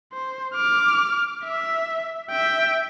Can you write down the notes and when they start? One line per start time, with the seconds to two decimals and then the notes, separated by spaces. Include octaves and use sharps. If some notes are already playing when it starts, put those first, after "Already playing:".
0.13 C5
0.54 D6 F6
1.44 E5
2.31 E5 G5